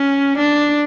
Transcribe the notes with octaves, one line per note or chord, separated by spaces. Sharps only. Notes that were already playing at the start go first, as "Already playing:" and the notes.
Already playing: C#4
D4